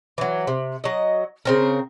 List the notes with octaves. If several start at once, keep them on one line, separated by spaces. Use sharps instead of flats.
E3 F#3
C3
F#3 D#5
C#3 C4 A#4